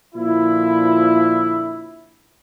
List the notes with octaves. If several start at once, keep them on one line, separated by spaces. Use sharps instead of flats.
A#2 D3 F3 E4